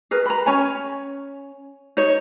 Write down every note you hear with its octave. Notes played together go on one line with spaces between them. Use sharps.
G#4 A#4 B4
A#5 B5
C#4 C#5 G#5
D#4 C#5